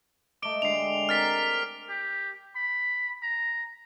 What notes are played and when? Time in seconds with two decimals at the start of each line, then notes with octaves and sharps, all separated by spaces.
0.42 A3 D#5 D6 D7 G7
0.62 D3 G#3 G4 C7 F7
1.09 C4 A#4 F6 A6 B6
1.89 G4
2.56 B5
3.23 A#5